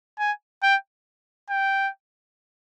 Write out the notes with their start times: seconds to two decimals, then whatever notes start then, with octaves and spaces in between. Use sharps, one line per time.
0.19 G#5
0.63 G5
1.50 G5